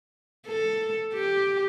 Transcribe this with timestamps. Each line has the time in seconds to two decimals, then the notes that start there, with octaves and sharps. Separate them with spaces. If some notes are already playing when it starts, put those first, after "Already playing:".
0.47 A4
1.15 G4